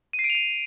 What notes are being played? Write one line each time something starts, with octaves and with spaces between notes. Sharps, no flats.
D#7
C7
D7
F7
D#7